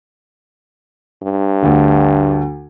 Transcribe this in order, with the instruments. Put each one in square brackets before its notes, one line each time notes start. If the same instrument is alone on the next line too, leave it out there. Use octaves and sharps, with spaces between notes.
[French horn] G2
[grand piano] D2 D3